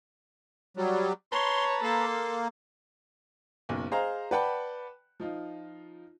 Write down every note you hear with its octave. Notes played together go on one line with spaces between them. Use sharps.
F#3 G3
B4 C#5 A5 A#5 C6
A#3 A4 C6
F#1 B1
G#4 C5 D#5 F5 A#5
B4 D5 F#5 G5 A5 B5
F3 D#4 F4